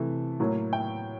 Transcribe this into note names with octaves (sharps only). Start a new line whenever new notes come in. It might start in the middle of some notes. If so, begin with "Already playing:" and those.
Already playing: C3 E3 A3
A2 F#3 A#3
G5